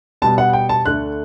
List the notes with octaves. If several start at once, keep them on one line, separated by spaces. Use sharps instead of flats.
B2 G3 B3 A5
F#5
G5
A5
D2 D3 A3 F#6